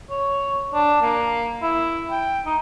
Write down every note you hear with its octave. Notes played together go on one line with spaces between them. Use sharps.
C#5
D4
A#3
E4
G5
D#4